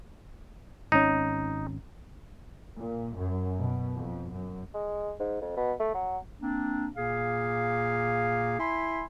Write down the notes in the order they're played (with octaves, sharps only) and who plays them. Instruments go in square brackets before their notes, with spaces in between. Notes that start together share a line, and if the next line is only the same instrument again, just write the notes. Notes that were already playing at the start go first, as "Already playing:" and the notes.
[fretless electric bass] G#1 C#4 [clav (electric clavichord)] D#4
[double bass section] A#2
F#2
B2
F2
F#2
[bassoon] G#3
G#2
F2
B2
A3
F#3
[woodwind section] A#3 C4 D4
A#2 A#3 G#4 F5
E4 G#5 B5 C6